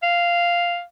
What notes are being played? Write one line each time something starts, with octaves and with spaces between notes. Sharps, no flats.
F5